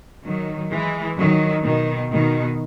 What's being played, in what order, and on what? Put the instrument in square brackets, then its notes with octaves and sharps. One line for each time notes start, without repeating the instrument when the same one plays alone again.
[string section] D#3 F#3
E3 G#3
D#3 F#3
B2 D#3
B2 D#3